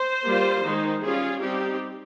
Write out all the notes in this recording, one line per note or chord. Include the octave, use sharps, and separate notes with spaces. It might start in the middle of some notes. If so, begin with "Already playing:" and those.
Already playing: C5
G3 A#3 F4
D#3 G#3 D#4
G3 C#4 F4 G#4
G3 C4 D#4 G4